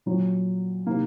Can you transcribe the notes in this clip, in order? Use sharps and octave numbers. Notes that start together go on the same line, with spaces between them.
A#2 F#3
C3 D#3 A#3